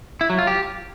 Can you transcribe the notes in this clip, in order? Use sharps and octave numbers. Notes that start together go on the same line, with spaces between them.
E4
F#3
F4
G4